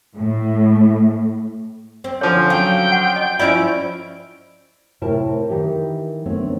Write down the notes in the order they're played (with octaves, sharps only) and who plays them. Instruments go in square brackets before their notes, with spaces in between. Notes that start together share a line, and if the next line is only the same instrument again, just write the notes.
[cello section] A2
[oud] C4
[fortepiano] D3 F3 C#4 [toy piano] C#5
[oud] F#3 [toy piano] F5 [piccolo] G5
[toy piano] F#5
D#5
[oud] F3 C#4 E4 [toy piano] F4 D5 D#5 [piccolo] D7
[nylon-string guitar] A2 C3 E4 A#4 A5
D#3 E3 G4
D3 D#3 A3 B3 C4 C#5